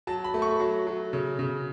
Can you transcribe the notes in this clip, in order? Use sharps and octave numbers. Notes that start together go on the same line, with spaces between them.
F#3 A5
B5
A3
C#6
F#3
F#3
C#3
C#3